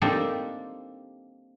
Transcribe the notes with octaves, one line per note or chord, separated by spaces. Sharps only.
A#3 C4 D4 D#4 G4 A4